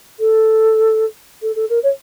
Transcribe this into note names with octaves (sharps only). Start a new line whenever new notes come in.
A4
A4
A4
A#4
C#5